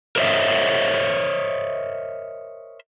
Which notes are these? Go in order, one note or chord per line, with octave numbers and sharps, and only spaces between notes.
A#4 C5 C#5 D#5 E5